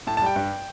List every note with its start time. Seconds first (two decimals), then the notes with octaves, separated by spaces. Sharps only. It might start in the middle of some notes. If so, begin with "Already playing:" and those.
0.07 A2 A5
0.17 A5
0.22 G3 G5
0.36 G2